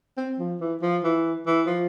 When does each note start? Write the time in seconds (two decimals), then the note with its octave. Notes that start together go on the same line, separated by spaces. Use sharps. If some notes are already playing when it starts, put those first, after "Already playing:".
0.17 C4
0.39 F3
0.61 E3
0.82 F3
1.04 E3
1.47 E3
1.67 F3